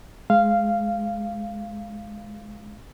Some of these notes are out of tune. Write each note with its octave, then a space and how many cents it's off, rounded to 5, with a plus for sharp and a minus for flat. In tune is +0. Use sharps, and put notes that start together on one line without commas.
G#3 +15 F5 -10